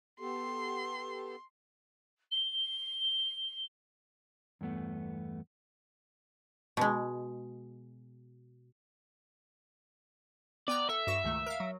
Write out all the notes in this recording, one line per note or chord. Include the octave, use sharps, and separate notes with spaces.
B3 G4 A4 C6
G7
E2 G2 A3 B3
B2 G#3
B3 D5 G5 A#5
A4 E5
G2 F#4 C#6
C#2 D#3 A3
A#4 F5
F#3